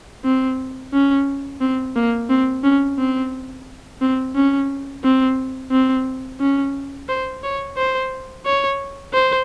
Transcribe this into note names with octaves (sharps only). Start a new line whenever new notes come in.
C4
C#4
C4
A#3
C4
C#4
C4
C4
C#4
C4
C4
C#4
C5
C#5
C5
C#5
C5